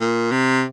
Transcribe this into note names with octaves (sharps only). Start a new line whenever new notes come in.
A#2
C3